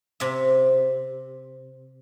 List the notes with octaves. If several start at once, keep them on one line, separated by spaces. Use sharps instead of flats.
C3 E5